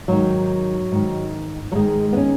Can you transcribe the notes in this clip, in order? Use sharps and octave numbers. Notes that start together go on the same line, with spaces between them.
G#2 D#3 F#3
G#2 D#3
F#3
G#2 D#3 G#3
B3
C#4